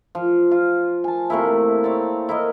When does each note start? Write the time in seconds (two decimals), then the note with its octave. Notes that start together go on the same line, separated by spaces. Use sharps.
0.15 F3
0.51 F4
1.04 G#5 A5
1.30 C3 A3 A#3 E4
1.84 C4 C#5 D5
2.29 E4 A#4 D#5